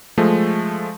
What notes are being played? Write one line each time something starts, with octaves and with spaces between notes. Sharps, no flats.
F3 G#3 A3